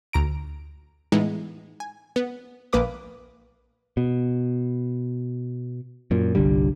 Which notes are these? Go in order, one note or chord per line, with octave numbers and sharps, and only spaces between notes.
D2 A#5 D7
A2 E3 G#3 B3 D#4
G#5
B3
A#1 A#3 B4 D6 D#6
B2
F#2 A#2
G1 C2 D3 G3